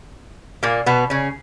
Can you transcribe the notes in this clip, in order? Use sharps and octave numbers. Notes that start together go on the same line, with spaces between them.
A#2 A#3
B2 B3
C#3 C#4